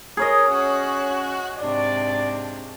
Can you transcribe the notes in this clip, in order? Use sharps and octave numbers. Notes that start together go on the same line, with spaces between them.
G#4 A#4 C#5 D#5
C#4 F#4 F#6
G#2 C3 D4 D5